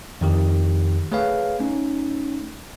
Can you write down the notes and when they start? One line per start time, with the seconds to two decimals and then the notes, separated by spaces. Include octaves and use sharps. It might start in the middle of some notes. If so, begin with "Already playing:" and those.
0.21 F2 D#3 G4
1.12 A3 G#4 B4 C#5 F5
1.59 A3 C#4 D#4